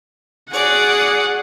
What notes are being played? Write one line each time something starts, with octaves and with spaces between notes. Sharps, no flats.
F#4 G#4 D5 F#5